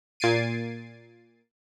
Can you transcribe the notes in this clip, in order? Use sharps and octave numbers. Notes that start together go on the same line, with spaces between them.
A#2 G#6 A6 C7 D7 D#7